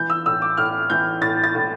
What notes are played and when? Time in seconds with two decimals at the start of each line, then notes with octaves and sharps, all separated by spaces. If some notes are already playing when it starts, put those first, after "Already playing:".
Already playing: E3 G6
0.10 E6
0.26 A2 E6
0.42 D6
0.57 A2 F6
0.90 E3 G6
1.21 A2 A6
1.44 A6
1.55 A2